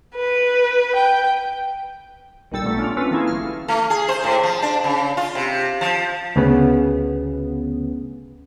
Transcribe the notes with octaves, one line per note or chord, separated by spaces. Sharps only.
B4
G5
A#1 D#2 A#2 G3 A4 E6
A1 A#2 A3 B3 A4
A3 C#4 D4 F4
C4 C#4 F4 A4 B4
E3 A3 A#3 E4 G#4
G1 F6
A3
G#4
C5
A2
F3
D4
C#3
F4
C3
F3
D2 C#3 B3